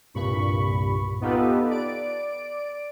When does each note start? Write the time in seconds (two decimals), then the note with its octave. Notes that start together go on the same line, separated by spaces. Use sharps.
0.14 C2 G2 A#2 B5 C#6
1.21 B3 D#4 F4 G4 A4 B4
1.69 D5 D7